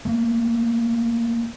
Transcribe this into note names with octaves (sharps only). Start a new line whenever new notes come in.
A3 A#3